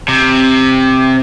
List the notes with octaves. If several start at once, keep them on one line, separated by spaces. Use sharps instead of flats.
C3